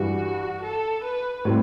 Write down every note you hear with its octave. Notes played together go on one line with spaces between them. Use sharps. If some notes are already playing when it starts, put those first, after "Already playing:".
Already playing: G2 E3 G3 F#4
A4
B4
A2 G3 C4